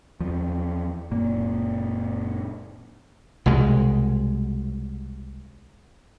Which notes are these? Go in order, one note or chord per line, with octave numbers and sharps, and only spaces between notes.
E2 F3
F#1 A#2 A#3
C2 B2 G#3